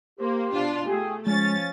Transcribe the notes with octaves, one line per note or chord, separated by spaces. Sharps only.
A#3 G4 C5
B2 D4 F4
A3 G4 G#4
F3 G#3 C#4 A6